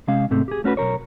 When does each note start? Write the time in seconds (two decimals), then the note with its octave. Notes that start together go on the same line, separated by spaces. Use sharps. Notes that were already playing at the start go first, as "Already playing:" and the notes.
0.07 C3 G#3 C#4 F5
0.31 G#2 C3 A3 C4
0.48 G4 G#4
0.64 A3 C#4 F#4 B4
0.77 B1 E2 A#4 C#5